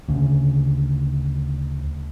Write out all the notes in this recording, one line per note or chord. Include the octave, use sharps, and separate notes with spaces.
D2 C#3